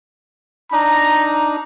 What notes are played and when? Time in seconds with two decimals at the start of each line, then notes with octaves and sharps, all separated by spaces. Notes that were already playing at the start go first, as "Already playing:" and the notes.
0.72 D4 D#4 A#5